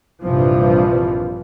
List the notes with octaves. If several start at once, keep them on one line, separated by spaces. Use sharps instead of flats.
A#1 G2 C3 E3 F3